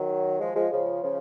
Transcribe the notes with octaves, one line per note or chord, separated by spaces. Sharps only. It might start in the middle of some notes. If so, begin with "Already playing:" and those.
Already playing: D#3 F#3
F3 G#3
F3 G#3
C#3 F3
C#3 F3